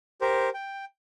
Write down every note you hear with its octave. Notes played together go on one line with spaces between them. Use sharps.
G4 A#4 C5
G5